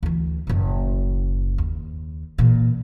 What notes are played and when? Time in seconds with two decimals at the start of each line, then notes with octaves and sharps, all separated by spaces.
0.03 D2 E3
0.47 F#1 A2
1.58 D#2
2.38 A#2 E3